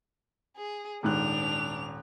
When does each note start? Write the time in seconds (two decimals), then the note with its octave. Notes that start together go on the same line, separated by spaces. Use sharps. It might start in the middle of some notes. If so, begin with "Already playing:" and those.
0.57 G#4
1.03 D#1 G#2 D4 F#6 F7